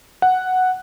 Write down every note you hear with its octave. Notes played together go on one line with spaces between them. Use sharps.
F#5